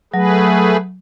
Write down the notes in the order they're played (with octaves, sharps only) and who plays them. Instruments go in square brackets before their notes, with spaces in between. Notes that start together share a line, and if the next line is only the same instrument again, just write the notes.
[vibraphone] F#3 [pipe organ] A3 G#4 B4